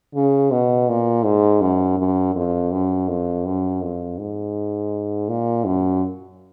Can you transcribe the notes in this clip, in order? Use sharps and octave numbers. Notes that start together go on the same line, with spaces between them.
C#3
B2
A#2
G#2
F#2
F#2
F2
F#2
F2
F#2
F2
G#2
A#2
F#2